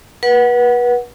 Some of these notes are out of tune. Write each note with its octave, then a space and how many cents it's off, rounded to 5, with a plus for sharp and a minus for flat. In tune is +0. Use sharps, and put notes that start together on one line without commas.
B4 -30 F#5 +0